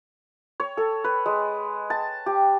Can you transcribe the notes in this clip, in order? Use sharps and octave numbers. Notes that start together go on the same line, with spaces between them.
C#5
A4
B4
G#3
A5
G4